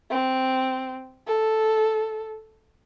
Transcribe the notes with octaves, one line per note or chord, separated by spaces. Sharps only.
C4
A4